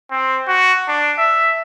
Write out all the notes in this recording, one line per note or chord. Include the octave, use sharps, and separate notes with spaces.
C4
F#4
D4
E5